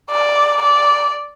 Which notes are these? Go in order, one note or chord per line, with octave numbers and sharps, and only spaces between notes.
D5
D5